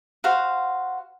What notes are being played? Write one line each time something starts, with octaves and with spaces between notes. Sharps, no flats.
F#4 C5 F5 F#5